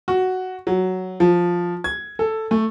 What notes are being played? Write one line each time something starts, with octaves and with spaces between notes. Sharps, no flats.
F#4
F#3
F3
G#6
A4
A3